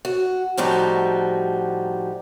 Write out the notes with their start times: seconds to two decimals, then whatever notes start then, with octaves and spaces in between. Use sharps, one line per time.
0.05 F#4
0.57 A2 F3 G3 D#4 F#4 G4